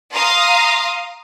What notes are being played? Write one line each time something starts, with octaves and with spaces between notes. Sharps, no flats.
F5 A#5 C6 D#6